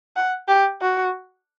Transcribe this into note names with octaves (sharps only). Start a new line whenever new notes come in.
F#5
G4
F#4